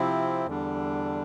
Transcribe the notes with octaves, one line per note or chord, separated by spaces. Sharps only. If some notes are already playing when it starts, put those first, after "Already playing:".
Already playing: C3 F3 C4 E4
E2 D3 G3 D4